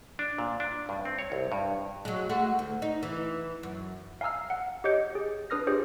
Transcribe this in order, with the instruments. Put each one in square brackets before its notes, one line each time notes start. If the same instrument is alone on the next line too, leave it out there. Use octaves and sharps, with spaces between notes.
[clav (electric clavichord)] D4
A#2
D4
G2
C4
C#5
C2
G2
[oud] F#3 G#3
G#3 A3 F#4
D2
D#4
E3
F#2
[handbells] F5 G#5 A#5 E6 F6
F#5
G4 C#5 D#5 D6 G6 C#7
G#4
D4 B4 D#6 F6 A#6
F4 G4 G#4 C5 D#6